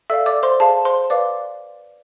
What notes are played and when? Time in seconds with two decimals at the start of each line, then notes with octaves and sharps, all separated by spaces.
0.10 A4 D5 E5 F5 E6
0.26 D5 D6
0.43 C5 C6
0.60 G#4 C5 F5 A5
0.85 C5 C6
1.10 B4 D5 F5 D6